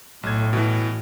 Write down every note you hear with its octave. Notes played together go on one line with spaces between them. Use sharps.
B1 A2 G#6
B2 E3